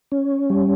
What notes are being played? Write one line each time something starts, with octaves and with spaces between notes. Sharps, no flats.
C#4
G3